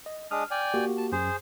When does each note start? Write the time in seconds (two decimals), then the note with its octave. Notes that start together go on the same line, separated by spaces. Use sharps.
0.06 D#5
0.31 G#3 D4 D#6 F6
0.51 D5 G5 G#5
0.74 A#3 F#4 G4
0.98 A5
1.12 F#2 G#4 C5